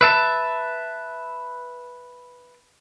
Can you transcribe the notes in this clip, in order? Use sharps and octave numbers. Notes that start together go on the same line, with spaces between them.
B4 E5 A5